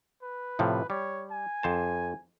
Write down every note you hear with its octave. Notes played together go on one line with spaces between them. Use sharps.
B4
A2 C3 F3
G3 C#5
G#5
F2 C5 A5